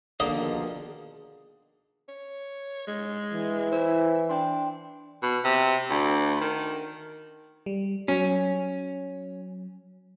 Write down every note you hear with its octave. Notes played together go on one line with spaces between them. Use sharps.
B2 D3 D#3 F3 A#3 G#4 D#5
C#5
G#3
E3
E4 C5
D4 G5 C6
B2
C3
D2
D#3
G3
F#3 C#4